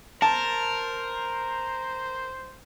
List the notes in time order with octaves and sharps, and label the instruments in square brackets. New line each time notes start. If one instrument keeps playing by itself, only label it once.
[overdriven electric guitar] A#4 [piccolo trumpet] C5 [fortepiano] A5